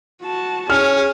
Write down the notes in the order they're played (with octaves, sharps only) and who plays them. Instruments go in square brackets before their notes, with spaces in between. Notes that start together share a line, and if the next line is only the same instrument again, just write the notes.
[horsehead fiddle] F#4 A5
[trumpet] C#4 [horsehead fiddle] G#4 [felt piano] F6